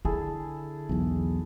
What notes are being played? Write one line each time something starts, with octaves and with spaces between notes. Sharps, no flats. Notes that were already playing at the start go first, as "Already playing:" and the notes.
D3 E4 G#4 A4
B1 E2